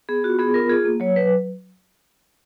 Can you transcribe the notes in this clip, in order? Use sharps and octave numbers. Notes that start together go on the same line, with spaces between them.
B3 G#4
F4 F#4
B3 G#4
F4 A#4
F4 G#4
A#3
F#3 C#5
F#3 B4